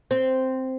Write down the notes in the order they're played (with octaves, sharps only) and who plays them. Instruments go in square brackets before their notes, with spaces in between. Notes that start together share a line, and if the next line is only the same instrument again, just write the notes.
[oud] C4